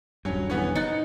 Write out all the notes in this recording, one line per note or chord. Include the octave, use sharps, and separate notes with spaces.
D#1 G2 F#3 C#4
E3 B3 C#4
D#4 F#6 A6 C#7